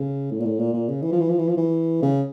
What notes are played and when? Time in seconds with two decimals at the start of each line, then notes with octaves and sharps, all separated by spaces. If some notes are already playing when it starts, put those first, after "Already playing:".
Already playing: C#3
0.31 A2
0.40 A#2
0.45 A2
0.59 A#2
0.74 A#2
0.89 C#3
1.02 E3
1.12 F3
1.21 E3
1.30 F3
1.39 E3
1.49 F3
1.57 E3
2.02 C#3